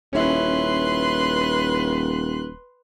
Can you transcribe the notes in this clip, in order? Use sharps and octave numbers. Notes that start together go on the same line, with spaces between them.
D#1 C#4 E4 B4 C6 F#6